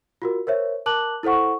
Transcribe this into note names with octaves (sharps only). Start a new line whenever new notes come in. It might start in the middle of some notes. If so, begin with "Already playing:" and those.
F4 F#4 A#4
A#4 C5 C#5 E5
A#4 A5 D6 F#6 F#7
E4 A4 C5 F#5 C#6